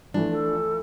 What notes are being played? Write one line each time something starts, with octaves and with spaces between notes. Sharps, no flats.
E3 F3 A3 D4
A4